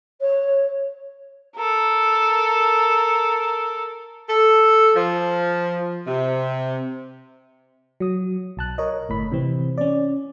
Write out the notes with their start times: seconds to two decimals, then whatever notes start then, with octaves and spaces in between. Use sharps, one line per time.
0.21 C#5
1.55 A4 A#4
4.29 A4
4.96 F3
6.07 C3
8.00 F#3 D#6
8.57 B1 A5 F#6
8.78 A#4 C#5 D#5
9.09 G1 A2 B5
9.32 C3 E3 C4
9.78 C#4 D5